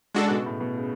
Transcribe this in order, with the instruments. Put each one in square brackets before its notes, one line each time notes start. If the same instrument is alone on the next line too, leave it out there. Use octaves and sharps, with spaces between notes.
[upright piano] C#3 [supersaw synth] G#3 D4 F#4 A4
[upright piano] B2
A2
B2
C#3